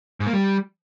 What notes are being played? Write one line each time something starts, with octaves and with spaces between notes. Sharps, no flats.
G#2
A#3
G3